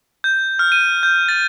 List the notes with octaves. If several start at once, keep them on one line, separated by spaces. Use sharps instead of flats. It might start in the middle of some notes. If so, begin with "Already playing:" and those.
G6
F6
D#7
G6
A6